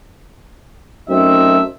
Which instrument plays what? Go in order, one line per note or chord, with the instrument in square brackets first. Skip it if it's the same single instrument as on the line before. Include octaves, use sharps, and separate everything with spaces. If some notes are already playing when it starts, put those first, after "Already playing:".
[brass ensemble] F#2 A3 C4 D#4 E5